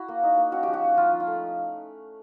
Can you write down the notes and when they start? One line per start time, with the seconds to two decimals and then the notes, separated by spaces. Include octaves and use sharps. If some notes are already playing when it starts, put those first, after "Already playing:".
Already playing: E4 F#4
0.08 A#3
0.23 D#4
0.37 A#3
0.52 C#4 F#4
0.63 F3 G4
0.73 F#4
0.83 C#4
0.97 F3 F4
1.12 F3
1.20 F4
1.27 A3